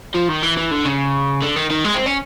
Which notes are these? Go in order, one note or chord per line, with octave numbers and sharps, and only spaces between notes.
F3
D#3
E3
E3
D3
C#3
D3
D#3
D#3
G#3
C4
C#4